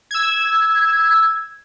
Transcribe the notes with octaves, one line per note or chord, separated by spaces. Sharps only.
E6 G#6